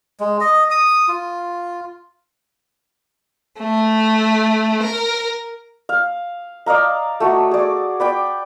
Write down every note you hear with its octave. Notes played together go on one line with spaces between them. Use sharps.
G#3
D#5
D#6
F4
A3
A#4
F5
D5 D#5 F5 A#5
A3 F#4
G#4 D5
B4 D5 G5